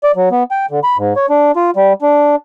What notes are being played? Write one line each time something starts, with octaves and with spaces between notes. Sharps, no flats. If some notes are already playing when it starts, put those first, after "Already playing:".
D5
F#3
B3
G5
D3
B5
G#2
C#5
D4
F4
G3
D4